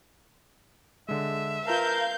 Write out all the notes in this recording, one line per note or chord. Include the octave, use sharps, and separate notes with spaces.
D3 G#3 E5
F4 A#4 B4 F5 A5 G6